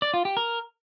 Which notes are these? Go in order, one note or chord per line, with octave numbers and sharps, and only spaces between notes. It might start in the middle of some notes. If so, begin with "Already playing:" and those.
D5
F4
G4
A#4